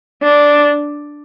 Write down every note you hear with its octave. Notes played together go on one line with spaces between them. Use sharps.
D4